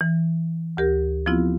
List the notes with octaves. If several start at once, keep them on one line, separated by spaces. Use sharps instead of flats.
E3
D2 G4 A#4
F3 B3 C4 E4 F4